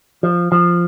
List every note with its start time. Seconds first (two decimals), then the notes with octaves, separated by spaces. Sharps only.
0.23 F3
0.52 F3